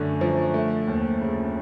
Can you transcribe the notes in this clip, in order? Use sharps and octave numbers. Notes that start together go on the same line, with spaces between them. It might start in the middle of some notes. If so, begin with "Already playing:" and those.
Already playing: F#2 D3 A3
F3
A3
D#2
C#3